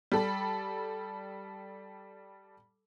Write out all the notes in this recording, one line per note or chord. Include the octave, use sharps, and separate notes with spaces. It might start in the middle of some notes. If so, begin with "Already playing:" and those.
G3 A4 B5